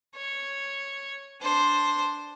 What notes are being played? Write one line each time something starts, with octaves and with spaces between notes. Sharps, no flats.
C#5
D4 C5